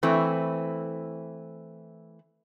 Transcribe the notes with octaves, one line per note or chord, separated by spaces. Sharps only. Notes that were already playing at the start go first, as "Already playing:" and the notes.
E3 A3 C4